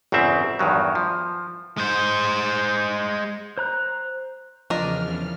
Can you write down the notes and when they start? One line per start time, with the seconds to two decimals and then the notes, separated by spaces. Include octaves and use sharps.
0.12 G1 E2 C#3 C4 E5
0.59 E2 G2 D#3 F#3
0.95 F3
1.77 G#3 C5
3.58 C5 A#5 F#6
4.70 E2 C#3 F3 D4 A#4 D#5 F6